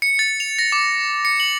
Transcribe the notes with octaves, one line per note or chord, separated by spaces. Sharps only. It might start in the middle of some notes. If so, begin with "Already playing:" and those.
C#7
A6
F7
A#6
D6
C#7
F#7